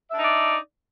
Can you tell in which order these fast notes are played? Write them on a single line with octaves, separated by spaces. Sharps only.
E5 D4 D#4 D5